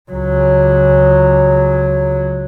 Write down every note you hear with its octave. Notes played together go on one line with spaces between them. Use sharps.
C#2 F#3